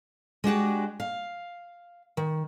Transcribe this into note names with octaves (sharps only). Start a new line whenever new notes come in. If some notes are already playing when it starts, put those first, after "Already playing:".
G#3 D4 F#4 G4
F5
D#3